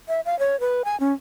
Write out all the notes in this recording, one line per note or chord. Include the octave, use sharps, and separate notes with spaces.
E5
F5
C#5
B4
G#5
C#4